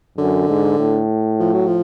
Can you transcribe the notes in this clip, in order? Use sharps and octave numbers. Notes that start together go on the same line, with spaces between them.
F#2 D3
G#2
A2
F3
F#3
F3